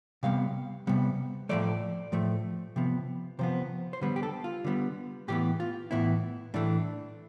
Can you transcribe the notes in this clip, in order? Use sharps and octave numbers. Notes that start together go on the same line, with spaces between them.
C3 G3 B3 F5
C3 G3 B3
A2 F3 A3 D5
A2 F3 A3
C3 F3 B3
C3 F3 B3 C5
C5
D3 G3 B3 B4
G4
A4
F4
D3 G3 B3
A2 E3 B3 G4
F4
A2 E3 B3 E4
A2 E3 A3 D4